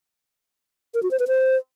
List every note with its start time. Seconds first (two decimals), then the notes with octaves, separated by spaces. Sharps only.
0.94 A#4
1.03 F#4
1.11 C5
1.19 B4
1.28 C5